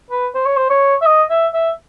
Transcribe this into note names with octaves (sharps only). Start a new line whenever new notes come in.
B4
C5
C#5
C5
C#5
E5
D#5
E5
E5